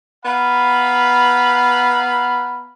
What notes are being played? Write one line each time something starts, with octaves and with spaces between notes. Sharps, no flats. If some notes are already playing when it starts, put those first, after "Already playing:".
B3 F5 A#5 B5